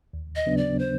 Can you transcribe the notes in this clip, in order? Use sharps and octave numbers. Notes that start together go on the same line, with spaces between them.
D#2
D#5
C#3 F#3 B3 D4
D5
C5